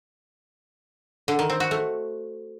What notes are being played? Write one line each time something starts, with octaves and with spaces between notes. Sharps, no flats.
D3
D#3
C4
F#4
A3